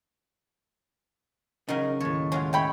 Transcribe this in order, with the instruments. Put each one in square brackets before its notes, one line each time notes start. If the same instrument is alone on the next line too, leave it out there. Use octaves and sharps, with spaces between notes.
[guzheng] C#3 F#3 [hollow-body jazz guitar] D#4 A#4
[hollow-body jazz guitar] D#2 A2 [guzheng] C#5
[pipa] F#3 F4 C#5 [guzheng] G#3
[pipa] C#3 G5 B5 [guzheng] A3 C#5